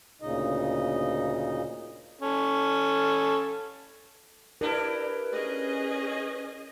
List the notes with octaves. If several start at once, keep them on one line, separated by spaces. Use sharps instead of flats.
D2 A#2 C#3 D#4 D#5
C#4 A4
D4 E4 G4 A#4 B4
C#4 G#4 D#5